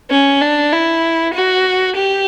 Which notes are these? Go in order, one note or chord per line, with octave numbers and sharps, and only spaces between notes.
C#4
D4
E4
F#4
G4